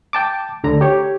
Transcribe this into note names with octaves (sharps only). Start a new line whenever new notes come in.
G5 A5 D6
D2 D3 A#5
G4 C#5